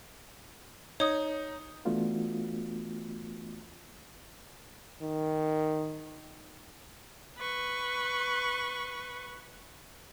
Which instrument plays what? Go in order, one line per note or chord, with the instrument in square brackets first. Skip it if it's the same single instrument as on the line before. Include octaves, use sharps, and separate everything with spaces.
[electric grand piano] D#4 [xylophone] C#5 D#6
[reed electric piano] E3 A3 B3 D4 F4 F#4
[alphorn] D#3
[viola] B4 C#6